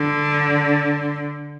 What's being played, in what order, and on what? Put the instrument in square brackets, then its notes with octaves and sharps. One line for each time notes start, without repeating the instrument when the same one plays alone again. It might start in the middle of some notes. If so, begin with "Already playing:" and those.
Already playing: [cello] D3